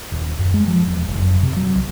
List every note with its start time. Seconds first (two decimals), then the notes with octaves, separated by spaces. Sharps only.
0.12 D#1
0.39 F#2
0.54 G#3
0.68 F3
0.88 E1
1.08 F#1
1.21 F#2
1.42 C3
1.56 F#3
1.75 B1